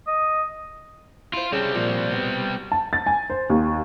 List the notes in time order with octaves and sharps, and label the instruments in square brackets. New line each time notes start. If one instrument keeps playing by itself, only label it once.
[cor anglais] D#5
[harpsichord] E4 C5 [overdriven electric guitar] F4
[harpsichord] C#3 A5 [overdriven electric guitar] G3 C4
[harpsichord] A#2 F3
B2
[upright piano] A5
A6
G#5
C5
D#2